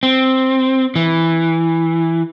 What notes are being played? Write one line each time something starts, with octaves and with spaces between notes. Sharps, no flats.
C4
E3